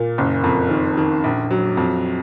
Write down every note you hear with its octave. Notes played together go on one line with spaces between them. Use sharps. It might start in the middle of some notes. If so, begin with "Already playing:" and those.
Already playing: A#2 A#3
F#1
F2
D#3
D#3
A#1
F#3
F2